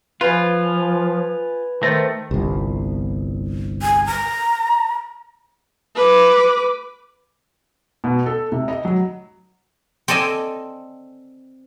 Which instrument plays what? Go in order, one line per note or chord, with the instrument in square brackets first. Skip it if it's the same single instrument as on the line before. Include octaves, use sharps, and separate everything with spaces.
[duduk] F3 [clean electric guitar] F4 [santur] B4 G#5
[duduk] D#3 [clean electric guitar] A3 [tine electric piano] C5 A6 A#6
[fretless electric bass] G1 C2
[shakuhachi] G#5
A#5
[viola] B4 D6
[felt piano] B2
A4
C3
D#5
F#3
[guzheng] C4 A4 D5 D#5 G#5